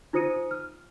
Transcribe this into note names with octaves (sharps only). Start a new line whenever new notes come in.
D#4 F4 C5 D#6 C#7 D#7
F6